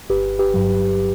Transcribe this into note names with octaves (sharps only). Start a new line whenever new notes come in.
G1 G4 B4
G4 B4
G2 F#3